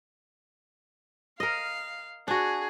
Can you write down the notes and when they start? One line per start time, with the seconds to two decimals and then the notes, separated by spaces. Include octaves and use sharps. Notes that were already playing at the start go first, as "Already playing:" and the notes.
1.40 A#4 D#5 F5
2.28 D4 F#4 G#4